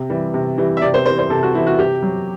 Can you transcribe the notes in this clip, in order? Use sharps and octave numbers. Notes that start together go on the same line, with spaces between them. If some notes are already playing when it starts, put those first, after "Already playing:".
Already playing: C3
E3 G3
C3
E3 G3
E5
C3 D5
C5
E3 G3 C5
C5
C3 A4
F#4
E3 G3 E4
F#4
C3 G4
F#3